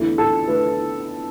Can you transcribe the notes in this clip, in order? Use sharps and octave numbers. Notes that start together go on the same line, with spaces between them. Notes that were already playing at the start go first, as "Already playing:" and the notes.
Already playing: E2 D3 A3 E4
A4
D3 A3 E4 B4